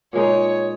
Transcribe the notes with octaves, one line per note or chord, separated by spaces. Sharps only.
A#2 G#3 D#4 C#5